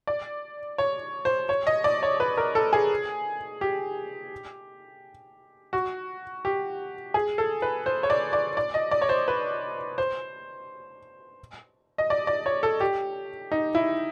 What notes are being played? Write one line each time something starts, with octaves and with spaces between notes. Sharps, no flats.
D5
C#5
C5
C#5
D#5
D5
C#5
B4
A#4
A4
G#4
G4
F#4
G4
G#4
A4
B4
C5
C#5
D5
D5
D5
D#5
D5
C#5
C5
B4
C5
D#5
D5
D5
C#5
A4
G4
D#4
E4